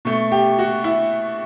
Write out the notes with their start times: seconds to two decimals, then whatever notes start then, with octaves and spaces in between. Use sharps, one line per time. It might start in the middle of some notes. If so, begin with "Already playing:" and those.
0.05 B2 A3
0.32 G4
0.59 F#4
0.84 E4